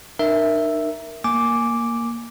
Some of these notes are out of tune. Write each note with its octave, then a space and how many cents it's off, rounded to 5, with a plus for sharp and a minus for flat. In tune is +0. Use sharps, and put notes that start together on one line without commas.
D#4 -40 A#4 +0 E5 +0
A#3 +0 G#5 +0 D6 -5